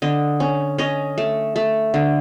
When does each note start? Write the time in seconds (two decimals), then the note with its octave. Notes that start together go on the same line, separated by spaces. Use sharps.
0.02 D3 D#5
0.40 C#4
0.78 C#4 D#5
1.18 A3
1.56 A3
1.94 D3